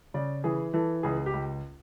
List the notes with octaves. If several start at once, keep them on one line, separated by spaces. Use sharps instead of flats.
C#3 D5
E3 G#4
E3 A4
C#2 G#4
G4
C#2